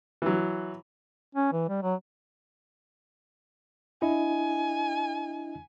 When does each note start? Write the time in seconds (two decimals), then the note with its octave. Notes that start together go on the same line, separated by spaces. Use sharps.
0.22 E3 F#3
1.35 C#4
1.52 E3
1.68 G3
1.83 F#3
4.02 D4 E4 D#5 G#5